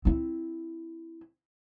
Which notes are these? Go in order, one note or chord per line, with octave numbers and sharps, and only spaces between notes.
C4 E4